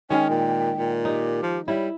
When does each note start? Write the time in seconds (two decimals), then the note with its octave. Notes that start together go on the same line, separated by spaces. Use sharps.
0.10 D#3 G#3 C#4 G5
0.30 A#2
0.77 A#2
1.05 D#4 G4
1.42 F3
1.68 G3 E4 C#5